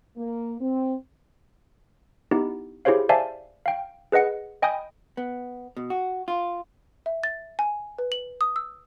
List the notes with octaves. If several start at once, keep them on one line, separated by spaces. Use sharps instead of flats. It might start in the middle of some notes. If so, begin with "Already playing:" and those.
A#3
C4
B3 D#4 E4 G4
E4 G4 G#4 C5 C#5 F5
C5 D5 E5 F5 G#5 A5
F5 G5
G#4 B4 D#5 F#5 C#7
D#5 G5 G#5 B5 D#6 G6
B3
B2
F#4
F4
E5
A6
G#5
B4
F#7
D#6
E6